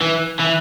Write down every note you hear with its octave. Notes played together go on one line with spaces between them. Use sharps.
E3
E3